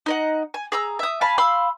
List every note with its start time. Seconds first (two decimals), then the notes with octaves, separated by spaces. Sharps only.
0.06 D#4 D#5 F#5
0.54 G#5
0.72 G#4 A#5 E6
0.99 E5 D#6
1.21 F5 G#5 A5 B5
1.38 F5 B5 C6 E6